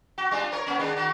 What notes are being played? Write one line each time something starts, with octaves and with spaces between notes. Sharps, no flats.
F#4
G3 D4 F4
A#4 C#5
A#3 C4 C#4
D#3 G#3 D4
D#3 F#4